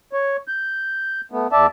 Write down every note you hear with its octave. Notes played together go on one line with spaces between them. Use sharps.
C#5
G6
A3 B3
E2 D5 E5 A5